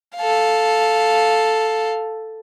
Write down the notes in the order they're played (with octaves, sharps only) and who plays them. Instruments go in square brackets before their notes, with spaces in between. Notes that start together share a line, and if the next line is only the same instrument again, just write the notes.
[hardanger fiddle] A4 F5